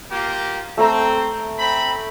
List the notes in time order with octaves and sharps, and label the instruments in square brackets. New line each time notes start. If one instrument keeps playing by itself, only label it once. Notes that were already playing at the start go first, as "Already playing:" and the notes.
[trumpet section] A#3 F4 G4
[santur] A3 A4 A#5 [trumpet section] C4
[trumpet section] C4 B5